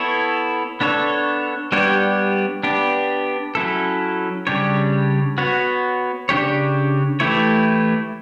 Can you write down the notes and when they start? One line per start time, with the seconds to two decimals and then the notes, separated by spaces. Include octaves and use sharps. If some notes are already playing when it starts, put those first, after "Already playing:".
Already playing: B3 E4 A4 C#5
0.81 B3 D4 A4 C#5
1.72 G3 B3 D4 G4 C#5
2.63 B3 D4 G4
3.55 F#3 C#4 E4 A4
4.47 C#3 G3 D4 G4 C#5
5.38 B3 F#4 C#5
6.29 C#3 G3 D4 G4 C#5
7.20 E3 A3 E4 G4 C#5